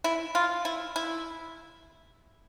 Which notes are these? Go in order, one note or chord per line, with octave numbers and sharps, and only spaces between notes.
E4
F4
E4
E4